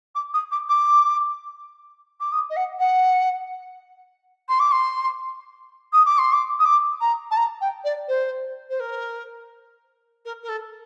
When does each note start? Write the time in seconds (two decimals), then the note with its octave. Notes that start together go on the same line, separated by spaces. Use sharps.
0.15 D6
0.33 D#6
0.51 D6
0.69 D6
2.20 D6
2.32 D#6
2.50 D#5
2.56 F#5
2.79 F#5
4.48 C6
4.59 D6
4.71 C6
5.92 D#6
6.05 D6
6.18 C6
6.32 D6
6.59 D#6
6.65 D6
7.00 A#5
7.30 A5
7.36 A#5
7.61 G5
7.84 D5
8.08 C5
8.69 C5
8.80 A#4
10.25 A#4
10.42 A#4
10.48 A4